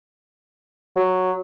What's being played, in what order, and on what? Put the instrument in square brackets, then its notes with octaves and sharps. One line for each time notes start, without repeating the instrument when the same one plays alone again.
[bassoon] F#3